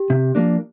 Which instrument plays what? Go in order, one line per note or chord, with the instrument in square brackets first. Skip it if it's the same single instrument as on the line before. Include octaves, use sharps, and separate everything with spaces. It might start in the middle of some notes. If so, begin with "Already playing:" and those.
Already playing: [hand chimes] G4
[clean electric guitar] C3
F3 A#3 D4